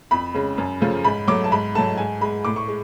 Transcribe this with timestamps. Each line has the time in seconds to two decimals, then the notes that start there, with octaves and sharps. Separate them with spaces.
0.11 F2 B5
0.34 C#3 G#3
0.58 F#2
0.81 C#3 F3 A3
1.04 G#2 B5
1.28 F#3 A3 D6
1.44 A5
1.52 G#2 B5
1.75 F#3 A3 A5
1.98 G#2 G#5
2.21 G#3 B5
2.45 A2 D6
2.56 C#6
2.68 G#3